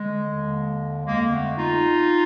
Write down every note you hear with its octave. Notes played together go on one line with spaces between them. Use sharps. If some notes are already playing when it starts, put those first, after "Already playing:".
Already playing: D3 G#3
D#2 D3
F2 D3 G#3 A#3
A3 B3
D#4 F4